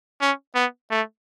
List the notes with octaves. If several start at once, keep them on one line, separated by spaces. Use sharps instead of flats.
C#4
B3
A3